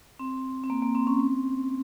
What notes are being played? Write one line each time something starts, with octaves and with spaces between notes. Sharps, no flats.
C4
C4
A#3
A#3
C4
C#4
C4